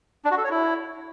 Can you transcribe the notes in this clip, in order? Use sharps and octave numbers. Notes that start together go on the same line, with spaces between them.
D4
F#4
A4
C#5
E4